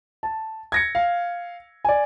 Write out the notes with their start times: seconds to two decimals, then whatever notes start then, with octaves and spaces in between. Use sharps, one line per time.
0.23 A5
0.72 G#6 A#6 C#7
0.95 F5
1.85 D5 G#5